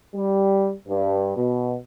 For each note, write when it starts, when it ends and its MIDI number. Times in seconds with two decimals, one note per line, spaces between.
0.15 0.72 55
0.87 1.34 43
1.36 1.75 47